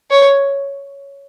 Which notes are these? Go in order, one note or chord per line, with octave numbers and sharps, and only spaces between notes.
C#5